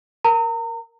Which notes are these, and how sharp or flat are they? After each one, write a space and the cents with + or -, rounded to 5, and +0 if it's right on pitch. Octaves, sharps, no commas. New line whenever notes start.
A#4 +5 A#5 -35